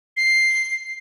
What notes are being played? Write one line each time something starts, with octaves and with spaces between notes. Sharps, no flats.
C7